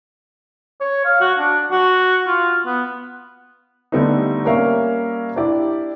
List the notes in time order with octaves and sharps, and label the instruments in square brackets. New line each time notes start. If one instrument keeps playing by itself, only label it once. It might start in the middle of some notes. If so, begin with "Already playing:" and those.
[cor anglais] C#5
F5
F#4
D4
F#4
F4
B3
[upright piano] D3 G3 A3 B3 D#4
G3 A#3 C#4 A#4 E5 F5
D4 E4 G4 D5